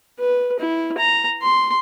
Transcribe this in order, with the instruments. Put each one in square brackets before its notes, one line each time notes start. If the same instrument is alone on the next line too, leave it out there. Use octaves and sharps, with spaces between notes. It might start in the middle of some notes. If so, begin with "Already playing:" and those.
[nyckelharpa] B4
E4
A#5
C6